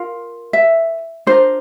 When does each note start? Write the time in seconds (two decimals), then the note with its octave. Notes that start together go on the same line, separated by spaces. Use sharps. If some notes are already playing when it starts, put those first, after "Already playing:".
Already playing: F4 A#4 F5
0.53 E5
1.27 D4 F4 A#4 C5